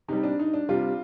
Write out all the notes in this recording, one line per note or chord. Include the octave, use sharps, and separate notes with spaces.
C3 G3 D#4
D4
D#4
D4
C3 G3 F4